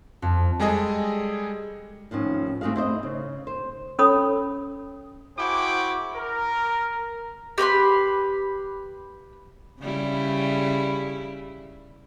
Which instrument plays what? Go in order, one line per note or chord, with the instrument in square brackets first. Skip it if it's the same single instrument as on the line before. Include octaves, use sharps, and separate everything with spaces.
[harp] F2
[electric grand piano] G3 G#3 G#4 A4 D#5
[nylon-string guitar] D#2 A2 F3 C#4
A3 C4 F#4 G#4 F5
E4 C5 D5 D#5
C#3
C5
[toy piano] C#4 A4 C#5 B5 D#6
[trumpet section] E4 F#4 G#4 C5 G5 D6
A#4
[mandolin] G4 B4 B5 C6
[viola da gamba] C#3 G3 E4